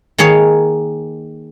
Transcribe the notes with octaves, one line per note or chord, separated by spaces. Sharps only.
D#3 A#3 G#4 C#5 F5